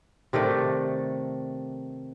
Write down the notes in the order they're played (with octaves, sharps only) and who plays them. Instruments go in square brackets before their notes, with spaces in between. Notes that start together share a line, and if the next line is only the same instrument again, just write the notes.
[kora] C3 D#3 A3 D5